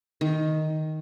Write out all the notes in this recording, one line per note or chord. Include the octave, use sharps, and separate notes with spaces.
D#3